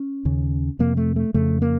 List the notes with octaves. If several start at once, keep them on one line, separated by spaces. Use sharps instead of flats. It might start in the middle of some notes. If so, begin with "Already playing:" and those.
Already playing: C#4
D#2 C#3
F2 C3 A#3
A3
A3
F2 C#3 A3
A#3